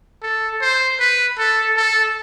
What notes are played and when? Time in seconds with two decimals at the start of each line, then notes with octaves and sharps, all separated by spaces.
0.23 A4
0.61 C5
1.00 B4
1.38 A4
1.77 A4